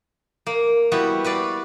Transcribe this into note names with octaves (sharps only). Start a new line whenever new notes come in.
A#3
G3 B3 E4 F#4
F#4 B4 D5 F5